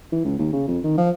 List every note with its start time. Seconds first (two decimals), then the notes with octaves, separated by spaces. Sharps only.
0.12 E3
0.25 C#2
0.39 D#2
0.53 C#3
0.68 F2
0.84 D#3
0.97 F3